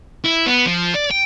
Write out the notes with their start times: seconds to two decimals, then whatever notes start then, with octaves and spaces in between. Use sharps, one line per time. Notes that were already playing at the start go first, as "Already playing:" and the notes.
0.24 E4
0.46 B3
0.66 F3
0.94 D5
1.11 G5